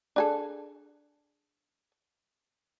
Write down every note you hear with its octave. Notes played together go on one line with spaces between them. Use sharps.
D4 G#4 A4